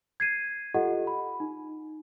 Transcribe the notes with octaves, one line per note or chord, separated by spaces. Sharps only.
G#6 C7 D#7
F4 G4 A4 D#5 F#5
B5
D#4